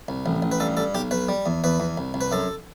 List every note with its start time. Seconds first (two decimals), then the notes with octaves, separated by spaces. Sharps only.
0.08 C2
0.26 A1
0.42 A1
0.52 B4
0.60 G2 A4
0.77 G2 A4
0.94 B1 G4
1.11 B1 B4
1.29 G3
1.46 E2
1.64 E2 B4
1.80 E2
1.97 C2
2.14 C2
2.21 B4
2.32 F#2 A4